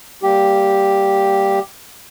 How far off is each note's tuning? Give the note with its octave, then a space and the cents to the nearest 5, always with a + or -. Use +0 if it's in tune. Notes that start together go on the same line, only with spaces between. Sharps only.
G3 +0 A#3 -10 G4 +0